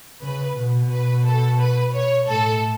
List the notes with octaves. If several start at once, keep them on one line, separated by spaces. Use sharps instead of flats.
C#3 B4
B2
B4
A4
B4
C#5
A2 A4